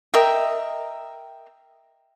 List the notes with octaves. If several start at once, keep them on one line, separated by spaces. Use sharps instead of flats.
A#4 D#5 E5 G5